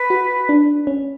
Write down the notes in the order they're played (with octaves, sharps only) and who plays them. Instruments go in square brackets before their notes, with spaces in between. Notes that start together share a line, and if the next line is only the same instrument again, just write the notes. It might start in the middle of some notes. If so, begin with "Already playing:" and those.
Already playing: [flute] B4
[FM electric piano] F#4
D4
C#4